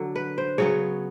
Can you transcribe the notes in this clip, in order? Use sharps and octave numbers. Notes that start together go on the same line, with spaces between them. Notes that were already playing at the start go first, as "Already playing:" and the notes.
Already playing: D3 F#3
B4
C5
C#3 F#3 B3 C#5